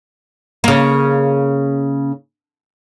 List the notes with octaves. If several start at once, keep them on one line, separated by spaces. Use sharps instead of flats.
C#3 A#3